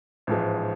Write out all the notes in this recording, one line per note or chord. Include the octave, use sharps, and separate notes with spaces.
A1 G#2 F3 G#3